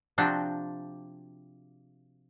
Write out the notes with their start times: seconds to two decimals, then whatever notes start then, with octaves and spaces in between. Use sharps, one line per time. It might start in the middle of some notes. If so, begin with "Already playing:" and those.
0.18 C3 F3 C4 D4 F#4 G4